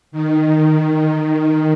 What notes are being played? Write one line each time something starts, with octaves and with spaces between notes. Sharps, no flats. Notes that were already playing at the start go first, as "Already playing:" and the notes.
D#3
D#3